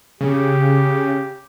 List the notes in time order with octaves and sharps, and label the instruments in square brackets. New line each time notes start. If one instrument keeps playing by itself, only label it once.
[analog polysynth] C#3 [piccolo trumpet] G4